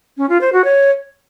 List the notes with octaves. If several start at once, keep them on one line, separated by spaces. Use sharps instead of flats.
C#4
F4
C5
F#4
C#5